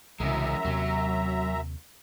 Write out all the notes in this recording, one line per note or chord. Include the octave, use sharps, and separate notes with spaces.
C2 F#2 C#3 E3 G#3 E5 A#5
D#2 C3 F#3